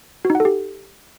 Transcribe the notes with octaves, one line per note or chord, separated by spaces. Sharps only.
F#4
D#4
F#5
A4
G4